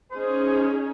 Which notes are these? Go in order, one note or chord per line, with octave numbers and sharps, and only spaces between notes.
C#4 D#4 G#4 C5